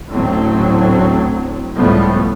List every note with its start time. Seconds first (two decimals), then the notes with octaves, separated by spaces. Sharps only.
0.10 A1 D2 A2 F#3 C4
1.76 C#2 A2 F3 G3 A3 B3